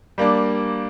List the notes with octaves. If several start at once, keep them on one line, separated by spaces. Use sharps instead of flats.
G3 A#3 D4